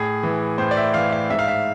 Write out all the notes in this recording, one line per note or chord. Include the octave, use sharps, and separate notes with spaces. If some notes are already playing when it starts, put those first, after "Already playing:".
Already playing: A2 G#4
E3
A2 C5
D5
E5
E3 F5
F5
G#2 E5
F5
E5